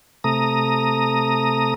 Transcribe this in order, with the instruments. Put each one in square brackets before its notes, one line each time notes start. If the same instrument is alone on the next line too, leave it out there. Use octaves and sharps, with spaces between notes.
[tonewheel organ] C3 A3 A#5 D#6